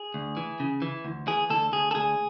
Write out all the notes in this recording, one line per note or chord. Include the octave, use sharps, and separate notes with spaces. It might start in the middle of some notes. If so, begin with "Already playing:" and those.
Already playing: G#4
D2
E3
C#3
E3
D2
E3 G#4
D2 A4
D2 G#4
A4
D2 G#4